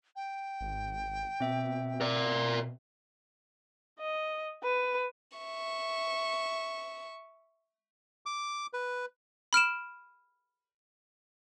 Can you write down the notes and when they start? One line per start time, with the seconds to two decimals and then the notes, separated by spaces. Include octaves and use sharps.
0.16 G5
0.61 G#1
1.40 B2 C4 E5
2.01 A#4 D5
4.00 D#5
4.63 B4
5.37 E5 C#6
8.26 D6
8.73 B4
9.53 B5 F6 D7 E7